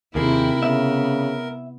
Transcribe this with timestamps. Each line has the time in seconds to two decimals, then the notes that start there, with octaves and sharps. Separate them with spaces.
0.15 D#2 C3 C4 E4 G#4 A#4
0.63 C#3 B3 E5